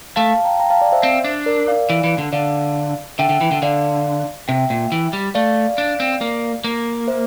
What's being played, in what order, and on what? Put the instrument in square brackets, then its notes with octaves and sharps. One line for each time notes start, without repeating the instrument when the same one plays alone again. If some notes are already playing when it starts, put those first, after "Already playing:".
[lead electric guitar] A3 [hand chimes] F5 A5
[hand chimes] F5 A5
G5 A#5
G5 A#5
F5 A5
D5 F5
C5 E5
[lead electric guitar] C4
D4
[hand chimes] A#4 D5
D5 F5
[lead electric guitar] E3
E3
D3
[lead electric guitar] D3 [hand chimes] D5 F5
[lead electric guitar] D3 [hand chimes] E5 G5
[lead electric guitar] D3
E3
D3
[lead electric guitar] D3 [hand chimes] D5 F5
[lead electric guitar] C3 [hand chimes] E5 G5
[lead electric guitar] A#2
E3
G3
[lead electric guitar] A3 [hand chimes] D5 F5
[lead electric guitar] D4
C4
A#3
A#3
[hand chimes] C5 E5